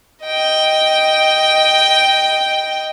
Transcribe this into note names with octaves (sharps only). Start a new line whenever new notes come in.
D#5 G5